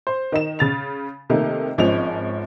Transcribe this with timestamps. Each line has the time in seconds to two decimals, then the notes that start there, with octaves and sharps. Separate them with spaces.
0.07 C5
0.32 D#3 D#4 E7
0.59 C#3 A6 F7
1.30 C3 D#3 A3 A#3
1.78 G#1 F3 G#3 C#4 F7